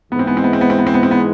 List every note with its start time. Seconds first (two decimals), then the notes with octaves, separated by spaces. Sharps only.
0.11 G#2 E3 G#3 B3
0.19 C4
0.27 B3
0.37 C4
0.44 B3
0.53 C4
0.61 B3
0.70 C4
0.78 B3
0.87 C4
0.94 B3
1.03 C4
1.11 B3